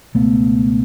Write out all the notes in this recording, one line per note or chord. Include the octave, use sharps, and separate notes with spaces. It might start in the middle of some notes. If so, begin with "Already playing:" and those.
C#2 B2 A3 B3